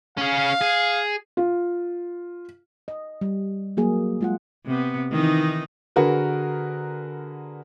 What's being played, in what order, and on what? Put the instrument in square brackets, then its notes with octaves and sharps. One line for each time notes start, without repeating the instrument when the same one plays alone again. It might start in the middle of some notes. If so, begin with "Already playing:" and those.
[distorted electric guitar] C#4 G#4 [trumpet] F5
[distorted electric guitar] G#4
[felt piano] F4
[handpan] D#5
G3
F#3 A#3 G#4
G#3 F4 F#5
[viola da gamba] C3 B3
D#3 E3 D#4
[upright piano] D3 F#4 G#4 A#4 B4